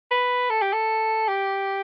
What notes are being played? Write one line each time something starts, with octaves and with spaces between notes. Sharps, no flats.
B4
A4
G4
A4
G4